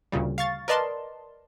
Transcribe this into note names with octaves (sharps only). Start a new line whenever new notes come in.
D2 A#2 C#3 G3
F5 C#6 A6
A#4 B4 D5 D#5 A5 C6